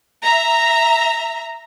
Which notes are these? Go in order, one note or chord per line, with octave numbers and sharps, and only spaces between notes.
E5 A#5